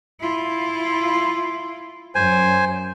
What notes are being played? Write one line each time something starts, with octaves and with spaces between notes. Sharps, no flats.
E4 F4
F#2 C5 G#5